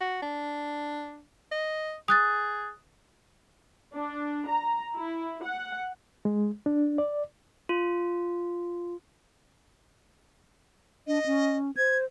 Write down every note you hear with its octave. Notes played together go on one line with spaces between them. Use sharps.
F#4
D4
D#5
G#4 D#6 F#6 A6
D4
A#5
E4
F#5
G#3
D4
D5
F4
D4 D#5
C#4
C5 G#6